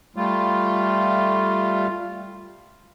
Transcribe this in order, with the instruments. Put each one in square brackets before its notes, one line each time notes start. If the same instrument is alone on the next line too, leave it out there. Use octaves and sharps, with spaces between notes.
[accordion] G3 A3 F4